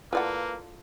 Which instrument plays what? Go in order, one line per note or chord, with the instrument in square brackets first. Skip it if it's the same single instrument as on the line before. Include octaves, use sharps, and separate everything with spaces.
[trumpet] A#3 [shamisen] E4 D5 F#5 [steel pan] F4 A4 [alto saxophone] B4